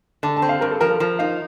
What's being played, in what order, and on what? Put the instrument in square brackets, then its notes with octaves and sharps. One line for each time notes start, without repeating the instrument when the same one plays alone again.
[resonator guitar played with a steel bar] D3 [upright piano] A5
[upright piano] A5
[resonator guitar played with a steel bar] C4
[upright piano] F5
[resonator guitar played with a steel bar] G2 [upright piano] A#4
[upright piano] A4
[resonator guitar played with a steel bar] F3 [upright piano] A#4
[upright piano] A4
[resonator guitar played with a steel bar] F3 [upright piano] A#4
[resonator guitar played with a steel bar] D#4 [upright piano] F5